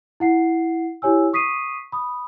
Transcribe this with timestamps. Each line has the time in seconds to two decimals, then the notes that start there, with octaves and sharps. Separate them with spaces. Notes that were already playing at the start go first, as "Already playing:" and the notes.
0.20 E4 F#5 C7
1.02 E4 G4 C#5 G#5 E6
1.33 C#6 D#6 B6 C7 D#7
1.92 B5 D#6